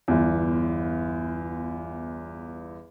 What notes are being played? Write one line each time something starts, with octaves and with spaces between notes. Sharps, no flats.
G1 E2